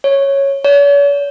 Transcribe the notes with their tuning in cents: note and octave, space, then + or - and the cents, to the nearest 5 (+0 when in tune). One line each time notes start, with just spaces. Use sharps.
C#5 -5
C#5 +45